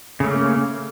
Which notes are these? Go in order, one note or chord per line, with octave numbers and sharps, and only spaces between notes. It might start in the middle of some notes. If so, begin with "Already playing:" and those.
C#3 A3 A#3 C#4